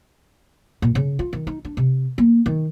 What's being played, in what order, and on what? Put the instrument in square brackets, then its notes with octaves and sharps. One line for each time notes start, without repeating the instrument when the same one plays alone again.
[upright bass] A#2
C#3
F4
D#3
D#4
D4
C3
A#3
D#3